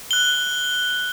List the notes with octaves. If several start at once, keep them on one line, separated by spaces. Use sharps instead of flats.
F#6 G7